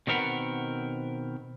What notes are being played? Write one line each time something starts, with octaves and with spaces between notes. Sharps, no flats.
B2 D#3 C4 A#4 B4 F#5